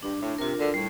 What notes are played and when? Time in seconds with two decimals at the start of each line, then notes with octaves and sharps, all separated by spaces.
0.03 G2 D4
0.20 A2
0.38 C3 F4 A#4
0.56 D2 D3
0.74 A2 G3